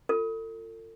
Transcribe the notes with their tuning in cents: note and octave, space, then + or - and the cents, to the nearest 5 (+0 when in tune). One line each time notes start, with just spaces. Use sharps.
F4 +0 A4 +35